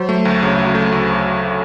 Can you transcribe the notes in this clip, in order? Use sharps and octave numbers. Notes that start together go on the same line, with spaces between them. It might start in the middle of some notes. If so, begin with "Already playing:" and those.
Already playing: F#3 C5
A3
D2
C#3
F#3
A3
D2